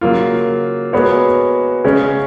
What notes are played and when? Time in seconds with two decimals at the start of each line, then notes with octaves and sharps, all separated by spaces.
0.01 C#3 F#3 A#3 F4
0.93 G#3 B3 F#4 A#4 C#5
1.84 C#3 G#3 C#4